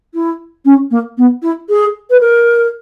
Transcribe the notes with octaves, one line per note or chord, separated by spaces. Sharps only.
E4
C#4
A#3
B3
E4
G#4
B4
A#4